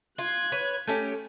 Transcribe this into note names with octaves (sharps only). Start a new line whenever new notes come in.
F4 F#6 G#6
B4 C#5
A3 C#4 G4 A4